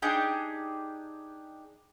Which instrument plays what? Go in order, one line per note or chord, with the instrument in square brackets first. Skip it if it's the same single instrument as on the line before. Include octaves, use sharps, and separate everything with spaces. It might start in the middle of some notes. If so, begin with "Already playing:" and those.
[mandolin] D4 D#4 G4 G#4